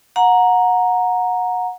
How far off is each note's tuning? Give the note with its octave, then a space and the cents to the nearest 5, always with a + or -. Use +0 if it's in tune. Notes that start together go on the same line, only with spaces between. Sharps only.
F#5 -25 A#5 +0